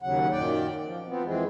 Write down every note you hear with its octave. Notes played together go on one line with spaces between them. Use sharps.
D#2 C#3 F#3 F#5
F#2 A#2 D#3 D5 G5
F3
F3 B3 C4
F2 E3 G#3 C4